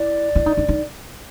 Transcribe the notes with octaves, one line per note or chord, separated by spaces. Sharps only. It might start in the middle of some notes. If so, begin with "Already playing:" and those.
Already playing: E4 D5
E4
D#4
D#4
D#4